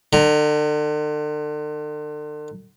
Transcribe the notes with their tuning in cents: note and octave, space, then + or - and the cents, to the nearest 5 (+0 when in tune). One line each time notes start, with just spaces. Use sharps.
D3 +40 A#5 +0